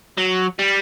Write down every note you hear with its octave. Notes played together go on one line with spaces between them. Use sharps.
F#3
G3